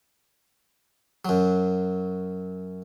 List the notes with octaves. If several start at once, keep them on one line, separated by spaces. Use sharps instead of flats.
F#2 F#3